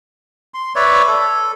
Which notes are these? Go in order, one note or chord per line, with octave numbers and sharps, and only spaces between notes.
C6
B4 C#5 D5 E5
A4